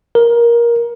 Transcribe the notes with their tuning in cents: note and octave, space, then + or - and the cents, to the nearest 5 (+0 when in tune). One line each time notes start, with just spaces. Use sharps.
A#4 +15